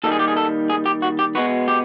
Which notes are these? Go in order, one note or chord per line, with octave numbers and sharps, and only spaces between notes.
D#2 D#3 G3 A4
G#4
G4
G#4
A4
G#4
G4
F#4
G4
B2 G#3 B3 F#4
G4